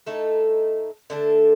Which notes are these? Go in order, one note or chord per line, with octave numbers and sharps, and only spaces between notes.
A2 A3 D#4 A4
D3 A3 D4 A4